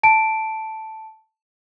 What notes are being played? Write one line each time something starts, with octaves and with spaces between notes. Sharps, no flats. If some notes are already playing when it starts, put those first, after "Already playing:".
A5 D7